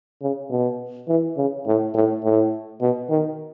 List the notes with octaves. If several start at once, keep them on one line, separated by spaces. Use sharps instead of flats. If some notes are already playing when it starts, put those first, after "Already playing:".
C#3
B2
E3
C#3
A2
A2
A2
B2
D#3